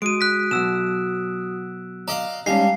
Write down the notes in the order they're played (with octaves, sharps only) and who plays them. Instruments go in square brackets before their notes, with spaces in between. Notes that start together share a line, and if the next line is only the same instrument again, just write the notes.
[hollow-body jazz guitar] G#3 [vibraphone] F#4 D#6 [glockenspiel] D7 D#7
[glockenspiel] F#6 B6
[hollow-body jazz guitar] B2 F#3 [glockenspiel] E6 E7
[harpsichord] D5 D#5 F5 [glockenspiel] A#5
[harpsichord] G3 [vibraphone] G#3 F5 A5 [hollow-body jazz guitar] C#4 D#4 [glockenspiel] C7